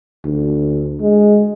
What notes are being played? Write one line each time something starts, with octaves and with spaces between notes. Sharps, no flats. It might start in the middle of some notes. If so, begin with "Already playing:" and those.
D2
G#3